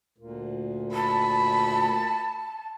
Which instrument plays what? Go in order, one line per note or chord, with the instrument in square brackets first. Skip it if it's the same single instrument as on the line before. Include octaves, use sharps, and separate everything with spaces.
[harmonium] D2 A#2
[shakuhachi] A5 [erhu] B5